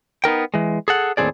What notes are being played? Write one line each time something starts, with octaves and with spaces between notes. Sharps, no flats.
B3 D#4 A#4 G5
E3 G#3
G#4 A4 F#5
D#2 A2 E3 C4 G#4 D5